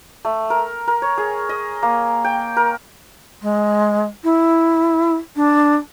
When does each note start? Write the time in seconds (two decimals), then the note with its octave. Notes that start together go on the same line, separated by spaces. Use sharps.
0.25 A3
0.50 A#4
0.88 A#4
1.02 C#5
1.18 G#4
1.49 D#5
1.83 A#3
2.24 G5
2.56 A#4
3.42 G#3
4.23 E4
5.36 D4